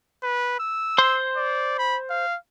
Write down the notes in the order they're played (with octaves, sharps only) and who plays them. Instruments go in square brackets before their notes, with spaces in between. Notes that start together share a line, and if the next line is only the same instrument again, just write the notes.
[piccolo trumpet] B4
E6
[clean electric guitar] C5 C6
[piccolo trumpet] D5
B5
F5